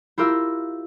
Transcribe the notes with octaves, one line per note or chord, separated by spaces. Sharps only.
E4 F4 G4 A#4 E6